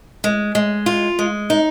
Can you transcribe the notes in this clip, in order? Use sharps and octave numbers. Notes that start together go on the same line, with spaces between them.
G#3
G#3
F4
G#3
D#4